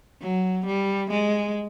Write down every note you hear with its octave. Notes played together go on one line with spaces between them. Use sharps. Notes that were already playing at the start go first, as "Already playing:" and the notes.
F#3
G3
G#3